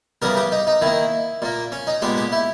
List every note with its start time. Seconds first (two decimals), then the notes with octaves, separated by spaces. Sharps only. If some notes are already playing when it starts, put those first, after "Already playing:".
0.22 C#3 E3 G3 B3 A#4
0.37 G4
0.52 D#4
0.67 D#4
0.82 D#3 A#3 E4
1.42 A#2 A#3
1.72 C#4
1.87 D#4
2.02 A#2 G#3 B3 G4
2.17 G4
2.32 E4